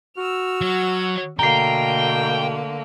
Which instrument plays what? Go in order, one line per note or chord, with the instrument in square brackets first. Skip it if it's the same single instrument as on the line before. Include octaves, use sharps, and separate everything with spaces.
[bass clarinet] F#4 [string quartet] E6 F6
[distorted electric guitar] F#3
[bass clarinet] B2 [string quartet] D3 A3 A#3 [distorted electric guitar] G5 [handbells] A#5 C7